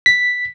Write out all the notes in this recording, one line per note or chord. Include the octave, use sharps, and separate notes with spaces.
B6